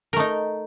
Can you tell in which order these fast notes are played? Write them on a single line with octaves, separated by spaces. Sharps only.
A#4 A3 D#4